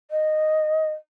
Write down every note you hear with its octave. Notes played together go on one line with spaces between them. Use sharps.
D#5